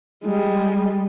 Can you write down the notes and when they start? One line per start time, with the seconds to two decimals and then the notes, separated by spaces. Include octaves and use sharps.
0.24 G3 G#3